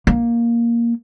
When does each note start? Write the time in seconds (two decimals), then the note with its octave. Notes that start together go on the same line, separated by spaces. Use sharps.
0.07 A#3